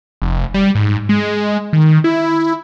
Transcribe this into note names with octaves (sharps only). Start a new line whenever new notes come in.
F1
G3
G#2
G#3
D#3
E4